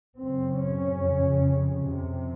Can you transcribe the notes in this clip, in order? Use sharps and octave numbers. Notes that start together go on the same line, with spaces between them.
F#2 C#3 C4
C#4
F2 C#3
F2 C3